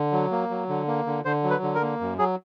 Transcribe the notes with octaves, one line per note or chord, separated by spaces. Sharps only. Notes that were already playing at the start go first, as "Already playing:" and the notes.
Already playing: D3
F#3
A#3
F#3
D3
A#3
D3
D3 C5
F#3
B4
D3
A#4
A#3
F#2
F#3 G#4